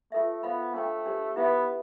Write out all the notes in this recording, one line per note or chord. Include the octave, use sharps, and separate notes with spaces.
A3 F4 A4 E5
B3 F4 C5 F5 B5
A3 D4 A4 C5 G5
D4 G4 C5
B3 E4 G4 B4 E5